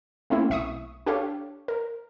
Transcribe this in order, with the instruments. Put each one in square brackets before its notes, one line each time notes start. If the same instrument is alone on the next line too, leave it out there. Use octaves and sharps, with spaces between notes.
[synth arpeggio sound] A3 A#3 C4 C#4 E4
B1 E5 C#6 D#6
D4 G4 A4 C#5 F5
A#4